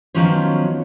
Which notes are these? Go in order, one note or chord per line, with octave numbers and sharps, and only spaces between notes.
D#3 F3 F#3 B3 C#4 C5